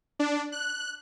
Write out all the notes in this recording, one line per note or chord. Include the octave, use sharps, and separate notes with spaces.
D4
F#6